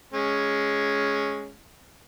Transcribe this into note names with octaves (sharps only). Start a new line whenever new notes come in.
G#3 C#4